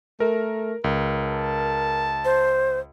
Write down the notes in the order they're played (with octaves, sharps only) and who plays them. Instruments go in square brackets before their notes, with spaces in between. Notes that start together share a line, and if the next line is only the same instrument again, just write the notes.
[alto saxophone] A3 [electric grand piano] A#4
[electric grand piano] C#2 [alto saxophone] A#4
[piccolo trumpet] A5
[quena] C5